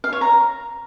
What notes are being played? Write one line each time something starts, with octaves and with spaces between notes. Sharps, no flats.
F5
C#5
A#5